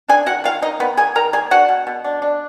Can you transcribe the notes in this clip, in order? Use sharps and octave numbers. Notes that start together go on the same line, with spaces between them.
D4 G#4 G#5
D#3 F#4 F#5
D#3 F4 F5
A#3 D#4 D#5
D#3 B3 B4
A#3 G#4 G#5
D#3 A#4 A#5
A#3 G#4 G#5
D4 F#4 F#5
B2
B2
D4
D4